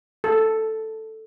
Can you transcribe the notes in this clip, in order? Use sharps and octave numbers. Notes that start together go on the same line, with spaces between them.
A4